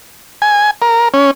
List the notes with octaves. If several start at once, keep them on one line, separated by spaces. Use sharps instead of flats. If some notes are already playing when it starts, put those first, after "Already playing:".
G#5
A#4
C#4